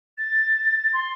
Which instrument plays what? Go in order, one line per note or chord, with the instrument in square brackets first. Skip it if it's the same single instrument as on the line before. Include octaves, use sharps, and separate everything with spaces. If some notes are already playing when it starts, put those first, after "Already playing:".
[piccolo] A6
C6